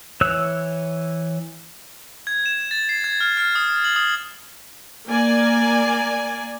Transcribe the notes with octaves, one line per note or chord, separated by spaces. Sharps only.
E3 C#5 E6 F#6
G#6
E7
A6
C7
G#6
F6
F6
D#6
F#7
D#6
A#3 D5 G#5